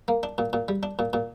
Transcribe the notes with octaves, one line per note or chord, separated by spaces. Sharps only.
A#3
D4
A#2
A#2
G3
D4
A#2
A#2